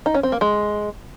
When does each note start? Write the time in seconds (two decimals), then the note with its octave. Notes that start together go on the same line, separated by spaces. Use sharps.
0.06 D#4
0.14 C#4
0.23 C4
0.32 A#3
0.41 G#3